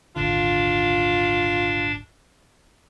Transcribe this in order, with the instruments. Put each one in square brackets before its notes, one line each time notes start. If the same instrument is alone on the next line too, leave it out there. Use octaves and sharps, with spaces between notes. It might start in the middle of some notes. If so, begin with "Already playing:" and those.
[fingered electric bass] D#1 G#1 D3 [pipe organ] D4 [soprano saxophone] F4